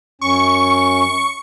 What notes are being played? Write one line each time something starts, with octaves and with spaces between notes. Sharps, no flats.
F#2 C#4 C#6